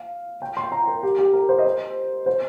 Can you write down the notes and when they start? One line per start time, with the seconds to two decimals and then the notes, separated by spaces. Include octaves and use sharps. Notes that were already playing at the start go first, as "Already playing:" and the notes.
Already playing: F5
0.42 G5
0.57 C6
0.72 A#5
0.87 A#4
1.03 G4
1.19 G4
1.33 A#4
1.49 C5
1.58 D#5
1.65 C5
2.26 C5